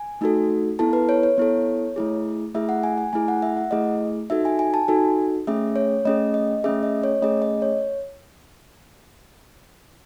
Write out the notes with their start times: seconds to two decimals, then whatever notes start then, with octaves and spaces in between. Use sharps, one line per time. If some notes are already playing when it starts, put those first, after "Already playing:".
Already playing: G#5
0.21 A3 D#4 F#4 A4
0.79 B3 E4 A4 A5
0.93 B4
1.09 C#5
1.23 C#5
1.38 B3 E4 A4
1.96 A3 E4 G#4
2.54 A3 E4 G#4 E5
2.69 F#5
2.83 G#5
2.98 G#5
3.13 A3 E4 G#4 G#5
3.28 F#5
3.42 E5
3.57 F#5
3.71 A3 E4 G#4 D#5
4.30 D#4 F#4 A4 E5
4.45 G#5
4.59 G#5
4.74 A5
4.88 D#4 F#4 A4 G#5
5.47 A3 C#4 G#4 E5
5.76 C#5
6.05 A3 C#4 G#4 D#5
6.34 D#5
6.64 A3 C#4 G#4 E5
6.83 D#5
7.04 C#5
7.22 A3 C#4 G#4 D#5
7.42 D#5
7.62 C#5